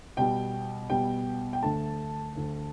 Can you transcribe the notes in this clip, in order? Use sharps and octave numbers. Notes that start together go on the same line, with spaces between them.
B2 G3 B3 G5
B2 G3 B3 G5
G5
D2 D3 A3 A5
D2 D3 A3